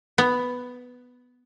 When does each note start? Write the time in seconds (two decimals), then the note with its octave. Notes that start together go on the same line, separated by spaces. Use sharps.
0.18 B3